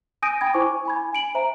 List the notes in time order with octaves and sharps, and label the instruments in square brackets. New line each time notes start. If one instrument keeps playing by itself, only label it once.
[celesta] G#5 D#6 G6 A#6 D7 D#7
G5 B5 G#6
E4 C5 G#5 C#6 D6
G#5 B5 G#6
G#5 B5 D7 F#7
C5 E5 A#5